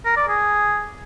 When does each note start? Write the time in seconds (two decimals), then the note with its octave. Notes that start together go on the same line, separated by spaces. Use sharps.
0.05 A#4
0.17 D5
0.28 G#4